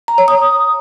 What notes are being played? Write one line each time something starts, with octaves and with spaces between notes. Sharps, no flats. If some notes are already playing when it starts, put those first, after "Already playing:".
A#5
C#5
D#6